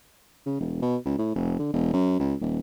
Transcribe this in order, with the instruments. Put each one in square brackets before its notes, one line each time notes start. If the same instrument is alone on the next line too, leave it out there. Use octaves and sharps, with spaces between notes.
[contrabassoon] C#3
E1
B2
C#2
A2
F1
D3
E1
F#2
C#2
D#1